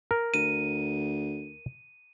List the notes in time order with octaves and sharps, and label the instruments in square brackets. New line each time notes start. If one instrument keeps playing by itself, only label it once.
[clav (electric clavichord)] A#4
[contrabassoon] D2 [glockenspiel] D#7